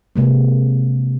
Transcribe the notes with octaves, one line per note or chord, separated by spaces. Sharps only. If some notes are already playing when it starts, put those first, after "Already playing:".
C3 G#3 A#3